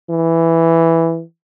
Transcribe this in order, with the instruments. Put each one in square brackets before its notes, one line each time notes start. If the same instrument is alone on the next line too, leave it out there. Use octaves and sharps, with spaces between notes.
[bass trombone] E3